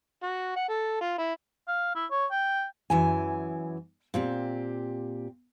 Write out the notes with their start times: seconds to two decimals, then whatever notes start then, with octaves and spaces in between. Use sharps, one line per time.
0.23 F#4
0.56 F#5
0.69 A4
1.01 F4
1.18 E4
1.68 F5
1.95 E4
2.11 C#5
2.31 G5
2.90 F#2 E3 G#5
4.14 A#2 C4 G4